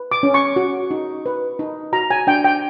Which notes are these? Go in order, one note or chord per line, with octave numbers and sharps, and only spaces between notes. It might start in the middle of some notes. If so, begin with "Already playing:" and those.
Already playing: B4
D6
C#4
C#6
F#4
D#4
B4
D#4
F#4 A#5
G#5
D4 G5
G5